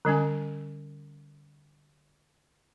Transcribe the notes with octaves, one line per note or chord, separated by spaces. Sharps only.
D3 G3 C#4 G#5